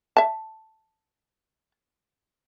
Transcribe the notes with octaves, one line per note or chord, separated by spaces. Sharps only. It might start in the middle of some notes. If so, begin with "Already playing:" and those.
E5 A5